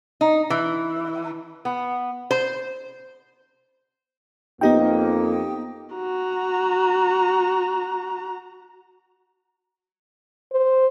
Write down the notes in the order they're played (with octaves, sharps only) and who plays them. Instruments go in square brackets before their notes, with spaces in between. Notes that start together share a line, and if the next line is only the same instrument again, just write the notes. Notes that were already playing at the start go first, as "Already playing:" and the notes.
[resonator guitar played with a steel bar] D#4
E3
B3
C5
[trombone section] F2 A#3 [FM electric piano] B3 G4 G5 [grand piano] D#4 D#5
[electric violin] F#4 A#5
[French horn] C5